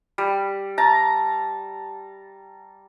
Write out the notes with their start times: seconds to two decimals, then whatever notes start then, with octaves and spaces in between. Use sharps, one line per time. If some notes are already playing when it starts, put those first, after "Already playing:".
0.18 G3
0.78 A5 A#5